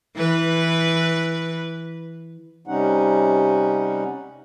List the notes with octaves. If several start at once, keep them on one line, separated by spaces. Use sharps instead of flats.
E3 B4
C3 G3 C#4 D#4 F#5